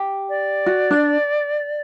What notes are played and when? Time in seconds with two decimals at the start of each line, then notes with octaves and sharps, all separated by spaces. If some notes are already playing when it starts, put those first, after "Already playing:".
Already playing: G4
0.29 D5
0.66 F#4
0.91 D4